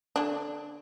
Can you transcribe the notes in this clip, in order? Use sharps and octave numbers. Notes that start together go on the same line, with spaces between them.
D3 D4